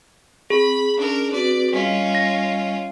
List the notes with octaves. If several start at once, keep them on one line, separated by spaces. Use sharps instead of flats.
C4 G#4 B5
C#4 D4 A#4
C4 F#4 B4 D5
G3 C#4 F4 D#5
A#6